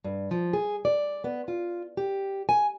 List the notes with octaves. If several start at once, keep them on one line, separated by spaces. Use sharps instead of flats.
G2
F3
G#4
D5
B3
F4
G4
G#5